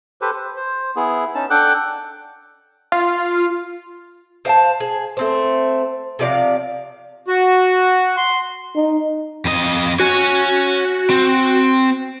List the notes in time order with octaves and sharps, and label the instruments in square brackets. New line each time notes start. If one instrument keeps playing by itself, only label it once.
[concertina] G4 A4 B4 C5
C5
C5
B3 E4 G#4
C#4 D#4 A5
D4 A4 F#5 G5 D6 F#6
[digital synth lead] F4
[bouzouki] C5 F5 G5 A5
G#4
A3 C4 C5
C3 F3 D5 F5
[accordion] F#4
C6
[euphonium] D#4
[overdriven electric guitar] F2 D#5
[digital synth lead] F#4 [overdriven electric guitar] C#5 G#5
[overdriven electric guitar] C4